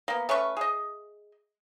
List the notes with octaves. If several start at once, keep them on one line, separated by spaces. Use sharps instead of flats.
A#3 B3
A3 C#4 B4 C#6
G#4 D#5